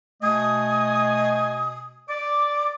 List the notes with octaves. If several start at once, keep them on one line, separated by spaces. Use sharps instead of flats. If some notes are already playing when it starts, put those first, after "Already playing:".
B2 A3 D#5 G#5 D#6
D5 D6